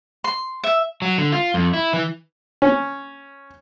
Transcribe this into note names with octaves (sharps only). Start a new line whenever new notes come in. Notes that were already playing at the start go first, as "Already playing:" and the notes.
C6
E5
F#3
D3
F4
F2
E4
E3
C#4